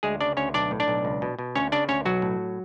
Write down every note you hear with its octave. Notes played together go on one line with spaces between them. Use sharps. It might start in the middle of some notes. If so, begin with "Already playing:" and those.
D2 G#3 G#4
C#3 D4 D5
D2 C#4 C#5
B1 D4 D5
A2
D4 D5
B1
C#2
B2
B2
D2 C#4 C#5
C#3 D4 D5
D2 C#4 C#5
B1 F#3 F#4
A2